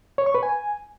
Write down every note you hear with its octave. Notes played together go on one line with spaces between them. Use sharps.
C#5
C#6
B4
G#5